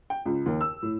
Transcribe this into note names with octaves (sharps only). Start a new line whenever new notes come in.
G5
C#2
D#2
E6
A2